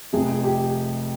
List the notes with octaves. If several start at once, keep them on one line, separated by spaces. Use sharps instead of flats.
F1 F2 C3 G#4
G4